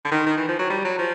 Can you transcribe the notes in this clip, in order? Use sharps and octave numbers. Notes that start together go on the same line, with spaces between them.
D3
D#3
D#3
E3
F3
F#3
G3
F#3
F3